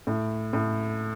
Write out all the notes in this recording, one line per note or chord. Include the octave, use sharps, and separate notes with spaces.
A2
A2